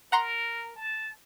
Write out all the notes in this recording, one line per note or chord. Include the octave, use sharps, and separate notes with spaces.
A#4 F#5 A#5 C6
A5